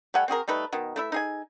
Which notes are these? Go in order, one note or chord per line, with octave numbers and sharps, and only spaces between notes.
G3 A3 F#5 G#5
C4 F#4 G#4 A#4
G3 A3 D#4 B4
B2 D#3
A3 E4 E5
D#4 G#4 G#5